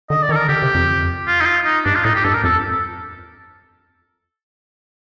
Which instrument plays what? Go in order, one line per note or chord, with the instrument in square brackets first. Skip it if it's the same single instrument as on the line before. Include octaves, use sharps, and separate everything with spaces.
[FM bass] D3 [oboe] D#5
[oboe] D5
[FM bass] D#3
[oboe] A4
A#4
[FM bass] D3 [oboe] G4
[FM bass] C3
F2
[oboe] F4
D#4
F4
D#4
[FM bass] G2 [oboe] D4
[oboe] F4
[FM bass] A2 [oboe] D#4
[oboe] G4
[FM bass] G2 [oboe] A4
[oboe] A#4
[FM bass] F2 [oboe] A4